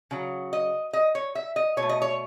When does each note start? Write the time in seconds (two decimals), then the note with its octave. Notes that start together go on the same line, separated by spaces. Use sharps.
0.11 C#3 F#3
0.53 D#5
0.93 D#5
1.15 C#5
1.35 E5
1.56 D#5
1.77 B2 C#5
1.82 A3
1.89 D#5
2.02 C#5